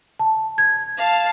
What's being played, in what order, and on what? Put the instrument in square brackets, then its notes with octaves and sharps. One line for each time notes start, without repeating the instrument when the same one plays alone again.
[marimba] A5
G#6
[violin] F5 A5